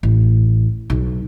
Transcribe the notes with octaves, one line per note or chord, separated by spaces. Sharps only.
A1
B1